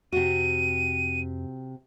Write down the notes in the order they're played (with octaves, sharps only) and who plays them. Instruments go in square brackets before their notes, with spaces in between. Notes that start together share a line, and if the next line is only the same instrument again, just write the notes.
[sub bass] F2 [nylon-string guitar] C3 F#4 [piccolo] D#7